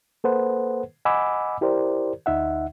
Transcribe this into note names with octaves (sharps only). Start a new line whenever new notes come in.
A#3 A4 B4 C5 F#5
D#5 F#5 G#5 B5 D6 E6
E4 G4 A#4 C5 D5
D2 D#4 E5 F#5